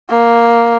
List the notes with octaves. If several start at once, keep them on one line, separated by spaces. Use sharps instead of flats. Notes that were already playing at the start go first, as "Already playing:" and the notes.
A#3